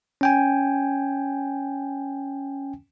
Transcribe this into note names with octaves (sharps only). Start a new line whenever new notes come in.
C#4 G5 G#5